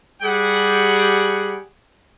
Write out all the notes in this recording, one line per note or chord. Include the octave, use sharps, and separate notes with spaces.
G3 G4 G#4 F#5